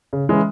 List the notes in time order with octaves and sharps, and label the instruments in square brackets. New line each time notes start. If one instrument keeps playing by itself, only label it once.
[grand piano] C#3
E3 G#3 C#4 E4